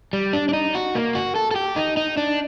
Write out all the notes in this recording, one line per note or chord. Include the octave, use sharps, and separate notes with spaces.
G3
D4
D4
D#4
F#4
A#3
F#4
A4
A4
G4
D#4
D#4
D4